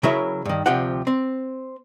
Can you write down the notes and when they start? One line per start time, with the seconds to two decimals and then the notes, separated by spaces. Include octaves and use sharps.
0.03 C#3 F#3 E4 A#4 C#5 E5
0.45 G2 D#3
0.66 D2 C3 F3 G4 F#5
1.07 C4